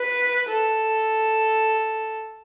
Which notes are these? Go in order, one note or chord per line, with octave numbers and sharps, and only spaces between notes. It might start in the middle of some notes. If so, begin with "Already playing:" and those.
Already playing: B4
A4